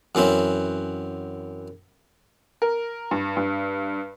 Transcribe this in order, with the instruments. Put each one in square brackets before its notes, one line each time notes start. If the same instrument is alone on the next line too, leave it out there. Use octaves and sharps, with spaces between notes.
[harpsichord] F#2 E3 C4 C#4
[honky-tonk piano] A#4
G2
G2